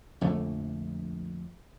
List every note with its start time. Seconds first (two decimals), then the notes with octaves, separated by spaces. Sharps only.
0.21 A#1 F2 D3 A3